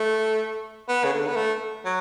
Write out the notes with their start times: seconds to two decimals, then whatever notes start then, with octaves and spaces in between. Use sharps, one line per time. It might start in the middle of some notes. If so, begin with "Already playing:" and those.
Already playing: A3
0.89 B3
1.05 C#3
1.13 D3
1.27 B3
1.36 A3
1.85 F#3